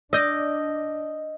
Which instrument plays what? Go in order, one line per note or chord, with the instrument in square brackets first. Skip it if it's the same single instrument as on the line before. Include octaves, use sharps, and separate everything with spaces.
[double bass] D4 [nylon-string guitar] D5 [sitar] D#5 [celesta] E6 G6 A#6